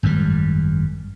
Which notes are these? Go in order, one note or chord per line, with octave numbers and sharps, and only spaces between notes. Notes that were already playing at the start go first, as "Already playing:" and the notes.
G#1 F#2 C#3 G3